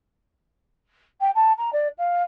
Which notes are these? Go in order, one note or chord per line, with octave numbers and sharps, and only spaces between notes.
G5
A5
A#5
D5
F5